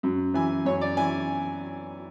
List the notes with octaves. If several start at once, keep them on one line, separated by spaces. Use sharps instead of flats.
F#2
E3 G#5
F#2 C#5
D5
E3 G#5